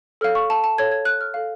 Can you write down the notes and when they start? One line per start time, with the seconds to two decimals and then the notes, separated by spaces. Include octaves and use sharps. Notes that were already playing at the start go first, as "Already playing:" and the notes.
0.21 A4 C#5 F5 F6
0.35 C#6
0.50 A5
0.64 A5
0.78 A4 C#5 F5 G#6
0.91 G#6
1.05 F#6
1.21 F6
1.34 A4 F5